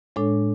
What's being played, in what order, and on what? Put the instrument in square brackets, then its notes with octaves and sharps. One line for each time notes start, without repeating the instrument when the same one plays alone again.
[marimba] A2 G#3 D4 A4 C#5